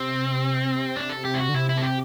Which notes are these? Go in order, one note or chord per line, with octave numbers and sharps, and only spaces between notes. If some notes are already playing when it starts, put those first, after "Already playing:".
Already playing: C3 C4
D4
A4
G4
E4
F#4
D3
C3 E4
E4
A4
G4